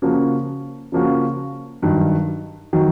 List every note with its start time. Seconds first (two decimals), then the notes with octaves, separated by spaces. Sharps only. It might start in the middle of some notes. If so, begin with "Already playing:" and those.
0.02 C#3 F3 A#3 C#4 F#4
0.92 C#3 F3 A#3 C#4 F#4
1.82 G2 D#3 F#3
2.73 D#3 F#3